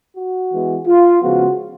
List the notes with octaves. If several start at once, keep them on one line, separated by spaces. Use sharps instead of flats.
F#4
E3 G#3 B3
F4
C#3 F3 G#3 B3 F#4